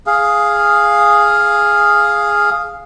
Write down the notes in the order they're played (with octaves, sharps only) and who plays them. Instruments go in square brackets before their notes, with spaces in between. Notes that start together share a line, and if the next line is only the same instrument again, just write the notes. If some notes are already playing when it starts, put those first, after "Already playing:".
[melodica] G#4 F5